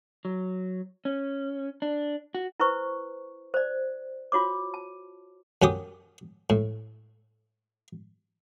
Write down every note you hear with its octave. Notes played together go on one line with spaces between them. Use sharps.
F#3
C#4
D4
F#4
E4 B4 C5 C#6
C5 D5
F4 F#4 C#5 D6
A5
F#2 C#4 G4 D#6
A2